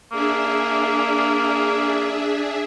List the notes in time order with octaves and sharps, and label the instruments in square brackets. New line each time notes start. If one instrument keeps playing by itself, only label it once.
[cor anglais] A#3 [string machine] D4 G#4 E5